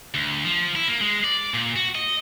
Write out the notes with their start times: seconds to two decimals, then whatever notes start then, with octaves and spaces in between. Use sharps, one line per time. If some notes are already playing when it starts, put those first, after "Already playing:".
0.14 D2
0.45 F3
0.75 E4
0.88 A#3
1.01 G#3
1.24 D5
1.54 A#2
1.76 F#4
1.95 D#5